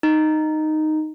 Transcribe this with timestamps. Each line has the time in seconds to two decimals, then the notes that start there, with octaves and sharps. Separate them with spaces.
0.03 D#4